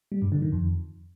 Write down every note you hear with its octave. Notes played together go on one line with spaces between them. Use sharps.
G3
G2
D3
D#3
F2